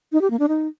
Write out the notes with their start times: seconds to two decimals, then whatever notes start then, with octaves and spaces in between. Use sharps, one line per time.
0.12 D#4
0.21 G4
0.30 A#3
0.39 D4
0.48 D#4